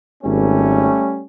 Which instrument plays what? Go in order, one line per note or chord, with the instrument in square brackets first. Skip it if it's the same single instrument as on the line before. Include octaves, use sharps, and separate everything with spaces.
[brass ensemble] G#1 [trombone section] G3 A3 C#4